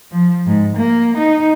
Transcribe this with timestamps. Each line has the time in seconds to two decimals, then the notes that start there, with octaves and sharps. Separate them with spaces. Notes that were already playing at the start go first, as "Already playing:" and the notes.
0.11 F3
0.46 G#2
0.76 A#3
1.17 D#4